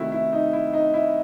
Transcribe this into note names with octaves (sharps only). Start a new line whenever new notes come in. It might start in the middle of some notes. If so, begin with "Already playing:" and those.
Already playing: C3 D#3 A3 E4 F#4
E4
D#4
E4
D#4
E4